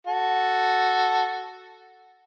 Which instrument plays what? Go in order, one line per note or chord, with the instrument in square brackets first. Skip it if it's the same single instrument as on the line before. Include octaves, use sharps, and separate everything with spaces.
[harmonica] F#4 A4